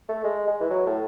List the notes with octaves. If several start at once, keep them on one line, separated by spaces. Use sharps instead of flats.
A3
G#3
G#3
E3
F#3
A2